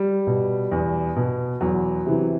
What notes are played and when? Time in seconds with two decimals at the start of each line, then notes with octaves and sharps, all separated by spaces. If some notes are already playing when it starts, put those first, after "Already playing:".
Already playing: G3
0.27 B2
0.71 E2
1.16 B2
1.61 E2 F#3
2.06 C3 E3